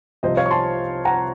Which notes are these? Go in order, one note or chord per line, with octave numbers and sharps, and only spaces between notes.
C2 C3 F3 C4 C5 D#5
C#5 F5
C#6
A5 C6
F#5 A#5